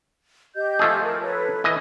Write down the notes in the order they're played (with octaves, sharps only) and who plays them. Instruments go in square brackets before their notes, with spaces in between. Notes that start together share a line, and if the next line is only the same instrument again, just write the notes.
[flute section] G4 D#5 G6
[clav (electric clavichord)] F3 A3 G#4
[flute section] A#4 A5
A4 B4 C#5
[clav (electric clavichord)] E3 D#5